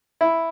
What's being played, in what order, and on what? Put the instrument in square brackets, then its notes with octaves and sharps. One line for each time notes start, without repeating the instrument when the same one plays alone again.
[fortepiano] E4